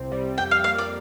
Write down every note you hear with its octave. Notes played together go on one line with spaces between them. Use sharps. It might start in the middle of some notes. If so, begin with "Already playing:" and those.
Already playing: C2 C3 C4
G3
F2 G5
F5
A#3 F5
D5